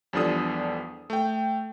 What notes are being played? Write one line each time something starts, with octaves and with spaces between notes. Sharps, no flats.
E2 F3 G3 D4 A4 D#6
A3 G5